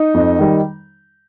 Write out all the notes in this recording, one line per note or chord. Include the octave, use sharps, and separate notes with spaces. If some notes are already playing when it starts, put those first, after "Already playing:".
Already playing: D#4
F2
D#3 G3